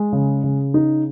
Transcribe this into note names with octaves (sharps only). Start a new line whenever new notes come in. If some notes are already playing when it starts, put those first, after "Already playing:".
Already playing: G#3
C#3
C#3
D#4